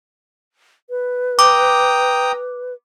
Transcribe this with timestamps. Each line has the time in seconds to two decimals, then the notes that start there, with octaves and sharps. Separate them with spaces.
0.90 B4
1.39 G5 A#5 D6 D#6